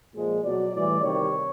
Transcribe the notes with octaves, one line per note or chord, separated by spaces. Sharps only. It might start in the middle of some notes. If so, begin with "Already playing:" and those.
A#2 F3 G#3
B2 F#3 D5
A2 E3 G3 D5
C3 D#3 G3 C#5